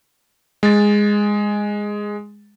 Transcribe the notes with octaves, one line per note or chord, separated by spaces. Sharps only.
G#3 A6